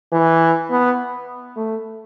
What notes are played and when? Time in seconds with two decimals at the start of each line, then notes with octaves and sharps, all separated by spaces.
0.12 E3
0.70 B3
1.57 A3